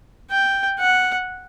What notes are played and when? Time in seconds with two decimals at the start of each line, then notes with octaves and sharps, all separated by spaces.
0.31 G5
0.79 F#5